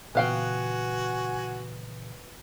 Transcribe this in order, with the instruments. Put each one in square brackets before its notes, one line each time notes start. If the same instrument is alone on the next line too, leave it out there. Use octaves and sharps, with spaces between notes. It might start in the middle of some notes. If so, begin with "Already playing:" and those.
[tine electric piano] A#2 C#3 E3 [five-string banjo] B3 F5 G5 [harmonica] F#4 G#5